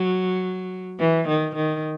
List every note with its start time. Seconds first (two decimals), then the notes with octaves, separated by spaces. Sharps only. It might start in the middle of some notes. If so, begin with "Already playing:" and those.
Already playing: F#3
0.99 E3
1.28 D#3
1.55 D#3